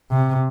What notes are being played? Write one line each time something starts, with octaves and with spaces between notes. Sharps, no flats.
C3